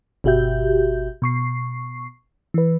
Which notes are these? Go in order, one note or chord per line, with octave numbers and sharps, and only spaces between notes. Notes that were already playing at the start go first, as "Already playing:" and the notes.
G1 B2 F#4 G4 E5 G6
B2 C#6 C7
E3 B4